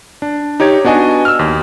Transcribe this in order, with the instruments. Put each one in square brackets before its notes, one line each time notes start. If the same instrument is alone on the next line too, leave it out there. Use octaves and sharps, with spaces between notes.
[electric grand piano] D4
D#4 G4 C#5 G#6
B3 D4 F#4 D#5 G#5
E6 F6
D#2